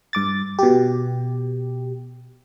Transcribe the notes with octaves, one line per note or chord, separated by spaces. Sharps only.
G2 D6 A6
B2 G4